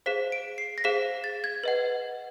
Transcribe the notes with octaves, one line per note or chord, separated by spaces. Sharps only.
G#4 C5 F5 B6
D7
C7
A#6
G#4 C5 F5 B6
A6
G#6
B4 D#5 F#5